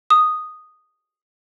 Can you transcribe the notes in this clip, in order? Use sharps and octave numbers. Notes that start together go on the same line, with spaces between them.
D#6